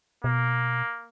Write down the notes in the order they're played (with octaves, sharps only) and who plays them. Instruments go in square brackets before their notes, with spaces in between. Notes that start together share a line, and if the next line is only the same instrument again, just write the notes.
[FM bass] B2 [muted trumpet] A#3